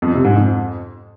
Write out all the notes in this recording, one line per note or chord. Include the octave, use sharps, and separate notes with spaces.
F2
C3
G#2
F2